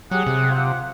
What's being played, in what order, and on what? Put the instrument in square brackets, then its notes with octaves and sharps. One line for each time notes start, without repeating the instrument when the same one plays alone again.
[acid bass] F#3 [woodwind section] G4 G#4 F#5
[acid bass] C3
[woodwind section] F4 C5 F#5